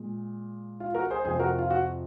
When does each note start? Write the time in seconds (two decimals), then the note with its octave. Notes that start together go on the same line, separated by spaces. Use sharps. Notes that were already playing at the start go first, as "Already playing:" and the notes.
Already playing: A#2 G#3
0.80 F4
0.94 F#4 A#4
1.10 G#4 C5
1.25 F2 C3 F3 G#4 C5
1.39 F#4 A#4
1.59 F4
1.70 F#4